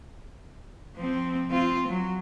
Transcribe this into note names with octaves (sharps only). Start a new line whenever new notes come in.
F3 C4
C4 F4
F#3